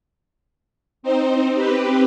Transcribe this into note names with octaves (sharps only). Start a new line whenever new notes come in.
C4 D#4 C5
C4 G4 B4